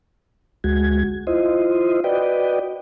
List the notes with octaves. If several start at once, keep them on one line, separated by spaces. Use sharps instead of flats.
D2 G#3 F#4 G#6
E4 F4 C5 D#5
F#4 B4 D5 D#5 G5